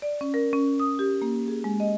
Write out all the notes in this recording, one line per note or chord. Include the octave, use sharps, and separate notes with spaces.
D5
C#4
A#4
C#4
D#6
G4
A#3
G#4
G#3
D#5